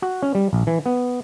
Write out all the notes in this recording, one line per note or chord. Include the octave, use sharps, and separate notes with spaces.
F#4
C#4
G3
A#1
E3
B3